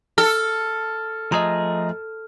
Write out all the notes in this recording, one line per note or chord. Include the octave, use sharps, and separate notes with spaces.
A4 F6
F3 A3 G#4 D#5 A#5